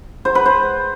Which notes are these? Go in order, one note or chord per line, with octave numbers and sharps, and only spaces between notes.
C5
B4
C5